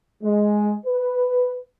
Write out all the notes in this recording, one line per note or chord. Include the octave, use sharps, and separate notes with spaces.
G#3
B4